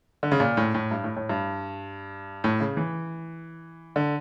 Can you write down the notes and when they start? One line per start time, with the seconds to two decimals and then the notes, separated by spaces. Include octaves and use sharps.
0.23 D3
0.32 C#3
0.40 A#2
0.57 A2
0.74 A2
0.91 G2
1.04 A2
1.16 A2
1.29 G2
2.44 A2
2.60 C#3
2.77 E3
3.96 D3